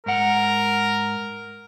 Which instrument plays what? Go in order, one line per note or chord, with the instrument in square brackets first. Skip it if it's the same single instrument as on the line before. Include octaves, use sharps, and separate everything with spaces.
[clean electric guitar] G#2 F#5 [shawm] A#4